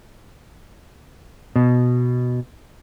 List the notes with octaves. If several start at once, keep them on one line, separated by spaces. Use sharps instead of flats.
B2